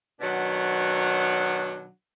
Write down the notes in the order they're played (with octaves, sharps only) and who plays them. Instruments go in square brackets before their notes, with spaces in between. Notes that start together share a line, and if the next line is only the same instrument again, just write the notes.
[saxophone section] B2 D#3 F#3 D4 F#5